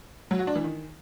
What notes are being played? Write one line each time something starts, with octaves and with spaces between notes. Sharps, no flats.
F#3
F#4
D4
E3
D#3